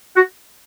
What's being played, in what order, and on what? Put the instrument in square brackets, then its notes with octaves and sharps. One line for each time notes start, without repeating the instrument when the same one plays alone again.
[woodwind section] F#4